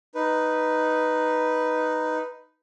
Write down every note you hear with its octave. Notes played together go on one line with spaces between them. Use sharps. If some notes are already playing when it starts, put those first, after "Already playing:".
D#4 B4